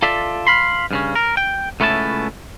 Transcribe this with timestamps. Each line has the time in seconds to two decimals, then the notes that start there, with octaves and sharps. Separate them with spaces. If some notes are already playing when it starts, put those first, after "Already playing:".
0.02 F4 A4 D5 E5
0.47 F5 B5 C6
0.91 G2 C#3 C#4
1.15 A#4
1.37 G5
1.80 C#2 A3 B3 C#4 E4 A5